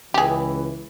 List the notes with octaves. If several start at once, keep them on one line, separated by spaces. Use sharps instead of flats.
C#2 E3 G4 G#4